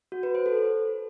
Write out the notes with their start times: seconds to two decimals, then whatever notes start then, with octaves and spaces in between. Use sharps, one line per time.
0.12 F#4
0.23 B4
0.35 C5
0.46 A4